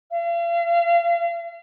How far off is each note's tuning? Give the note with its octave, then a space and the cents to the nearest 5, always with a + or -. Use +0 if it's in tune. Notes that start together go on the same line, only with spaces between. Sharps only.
F5 -40